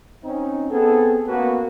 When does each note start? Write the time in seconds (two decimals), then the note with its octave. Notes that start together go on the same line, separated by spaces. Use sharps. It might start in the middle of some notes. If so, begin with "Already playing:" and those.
0.24 C4 C#4 D#4
0.70 B3 C4 G#4 A4
1.26 A#3 B3 C#4 F#4 B4